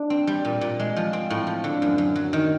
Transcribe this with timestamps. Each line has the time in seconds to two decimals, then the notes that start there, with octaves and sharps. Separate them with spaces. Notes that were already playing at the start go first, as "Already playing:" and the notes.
Already playing: D4
0.10 C4
0.27 G3
0.45 A#2
0.61 A#2
0.80 G#3
0.96 F3
1.13 C4
1.30 A2
1.47 F3
1.64 D3
1.82 F#2
1.98 F#2
2.16 F#3
2.33 D#3